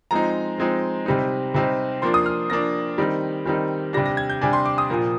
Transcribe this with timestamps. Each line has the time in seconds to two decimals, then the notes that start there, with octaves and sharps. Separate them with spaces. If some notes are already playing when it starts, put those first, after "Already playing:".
0.11 F3 G#3 C4 D#4 A#5
0.58 F3 G#3 C4 D#4
1.06 C3 G3 C4 D#4
1.54 C3 G3 C4 D#4
2.02 F3 A#3 D4 C6
2.14 D#6
2.26 F6
2.50 F3 A#3 D4 A#6
2.98 D#3 G3 C4 D#4
3.46 D#3 G3 C4 D#4
3.93 C3 G3 D4 A#6
4.06 A#6
4.17 G#6
4.30 G6
4.41 C3 G3 D4 G#5
4.53 C6
4.65 D6
4.78 D#6
4.90 A#2 F3 A#3